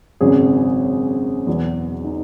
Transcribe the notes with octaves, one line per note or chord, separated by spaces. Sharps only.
G#1 F#2 C#3 F#3 G#4
E2 B2 F#3
D#4